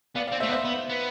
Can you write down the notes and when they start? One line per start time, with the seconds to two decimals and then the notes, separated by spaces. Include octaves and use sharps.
0.16 B3 D5 F5
0.27 D5 F5
0.32 C4
0.40 A3 C5 E5
0.49 B3
0.52 C5 E5
0.65 B3
0.89 B3